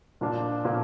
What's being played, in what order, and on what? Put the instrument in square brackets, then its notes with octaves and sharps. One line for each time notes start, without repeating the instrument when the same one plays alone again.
[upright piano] A#2 F3 A#3 D4 F4
A#2 F3 A#3 D4 F4